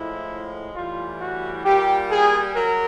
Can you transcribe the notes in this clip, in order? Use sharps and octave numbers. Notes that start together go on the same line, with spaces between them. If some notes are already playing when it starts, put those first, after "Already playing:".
Already playing: A2 F3 G#3 E4
A2 E3 G3 F4
F#4
A#2 G3 G4
G#4
F#3 A#4